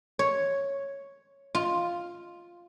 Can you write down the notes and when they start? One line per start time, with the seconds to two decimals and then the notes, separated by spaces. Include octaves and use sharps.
0.19 C#5
1.55 F4